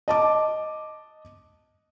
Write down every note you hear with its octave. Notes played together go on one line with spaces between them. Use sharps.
D#5 A5 D6